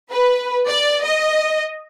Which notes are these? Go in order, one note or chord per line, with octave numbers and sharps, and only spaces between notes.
B4
D5
D#5